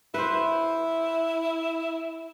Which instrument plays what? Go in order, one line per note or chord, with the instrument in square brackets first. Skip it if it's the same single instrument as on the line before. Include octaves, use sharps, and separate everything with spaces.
[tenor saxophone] E4 [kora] B4 C5